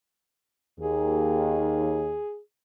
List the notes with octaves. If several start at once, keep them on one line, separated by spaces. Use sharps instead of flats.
D#2 G#4